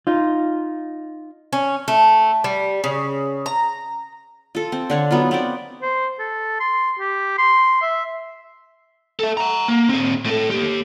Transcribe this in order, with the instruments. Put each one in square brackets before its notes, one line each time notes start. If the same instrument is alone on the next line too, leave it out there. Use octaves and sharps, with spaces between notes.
[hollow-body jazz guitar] D#4 F4
[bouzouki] C#4
A3
G3
C#3
A#5
[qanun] F4 A4
C4
D3 D4 C#5
F#3 B3 D#4 F4
B3 C4 D5
[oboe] C5
A4
C6
G4
C6
E5
[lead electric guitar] A4 E5
F#5 A#5
A#3
C4 G#4
A2 A4
A#3 G4